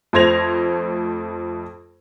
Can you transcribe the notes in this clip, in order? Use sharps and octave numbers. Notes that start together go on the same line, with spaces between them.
F2 A3 C5 G#6 A#6 F7